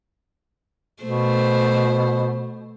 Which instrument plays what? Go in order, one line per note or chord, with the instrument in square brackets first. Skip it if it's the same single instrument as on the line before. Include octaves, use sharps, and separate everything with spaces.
[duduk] B2 [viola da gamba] A3 C5